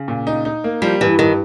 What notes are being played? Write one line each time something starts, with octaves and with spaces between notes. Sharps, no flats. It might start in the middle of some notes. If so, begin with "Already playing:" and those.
Already playing: C#3
A#2
D#4
D#4
A#3
F3 G3
G2 E3
G2 D#3